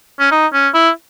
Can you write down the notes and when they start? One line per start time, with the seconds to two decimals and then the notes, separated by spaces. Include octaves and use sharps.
0.20 C#4
0.31 D#4
0.53 C#4
0.74 E4